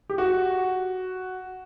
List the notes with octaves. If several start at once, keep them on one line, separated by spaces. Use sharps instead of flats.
G4
F#4